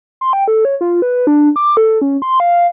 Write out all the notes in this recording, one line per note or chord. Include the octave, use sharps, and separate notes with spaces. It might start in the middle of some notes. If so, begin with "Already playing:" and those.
C6
G5
A4
C#5
F4
B4
D4
D6
A4
C#4
C6
F5